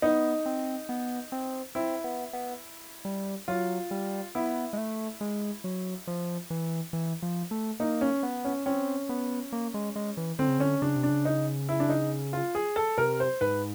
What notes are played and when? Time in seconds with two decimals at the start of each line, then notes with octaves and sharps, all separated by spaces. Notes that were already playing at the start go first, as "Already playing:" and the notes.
0.02 B3 D#4
0.46 C4
0.89 B3
1.32 C4
1.75 C4 E4
2.04 B3
2.33 B3
3.05 G3
3.48 F#3 F4
3.91 G3
4.35 B3 E4
4.73 G#3
4.78 A3
5.21 G#3
5.64 F#3
6.07 F3
6.50 E3
6.93 E3
7.23 F3
7.51 A3
7.80 A#3 D#4
8.01 C#4
8.23 B3
8.44 C#4
8.66 C4 C#4
9.09 B3
9.53 A#3
9.74 G#3
9.96 G#3
10.17 E3
10.39 D3 C4
10.49 C#3
10.58 D3 C#4
10.82 C#3 D4
10.96 C3
11.03 D4
11.10 C#3
11.25 D#4
11.69 E4
11.80 D4
11.89 D#4
12.33 F4
12.55 G#4
12.76 A4
12.98 C3 A#4
13.20 C5
13.41 G#2 B4